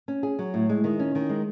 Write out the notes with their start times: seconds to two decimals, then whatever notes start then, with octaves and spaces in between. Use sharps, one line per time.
0.08 C#4
0.23 G#4
0.39 F#3
0.54 A2
0.69 G#3
0.84 D#3
0.99 C#4
1.15 D#3
1.30 G#3